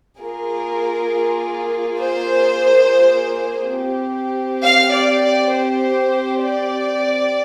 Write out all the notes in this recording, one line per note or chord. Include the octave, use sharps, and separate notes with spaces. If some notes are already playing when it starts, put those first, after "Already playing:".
A#3 F4 G#4 A#4
C5
C4
G4
F5
D5
D5
C5
D5